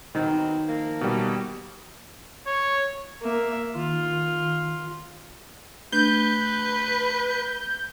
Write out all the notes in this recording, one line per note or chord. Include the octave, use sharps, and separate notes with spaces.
D#3 F#3 B3 C4
F3 A#3
B2 G3
C#5
A#3 E5
D#3 F4
A3 D4 B4 G6